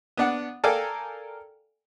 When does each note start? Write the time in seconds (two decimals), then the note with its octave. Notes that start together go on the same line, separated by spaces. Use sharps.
0.17 B3 D4 F#5
0.64 A4 A#4 D5 F5 G5 G#5